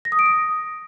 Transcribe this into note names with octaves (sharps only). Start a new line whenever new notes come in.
A#6
D#6
D7
D#6